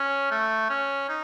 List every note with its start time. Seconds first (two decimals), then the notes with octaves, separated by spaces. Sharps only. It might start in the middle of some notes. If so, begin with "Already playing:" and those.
Already playing: C#4
0.31 A3
0.70 C#4
1.09 D#4